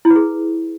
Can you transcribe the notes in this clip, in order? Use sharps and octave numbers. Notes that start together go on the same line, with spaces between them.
E4
B4
G#4